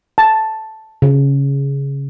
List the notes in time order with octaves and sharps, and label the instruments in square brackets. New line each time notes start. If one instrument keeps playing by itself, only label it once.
[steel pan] A5
[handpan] C#3